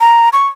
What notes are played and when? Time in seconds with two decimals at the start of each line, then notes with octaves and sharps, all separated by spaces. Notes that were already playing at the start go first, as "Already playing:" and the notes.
0.01 A#5
0.33 C#6